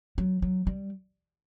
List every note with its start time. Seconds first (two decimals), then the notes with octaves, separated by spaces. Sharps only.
0.18 F#3
0.42 F#3
0.67 G3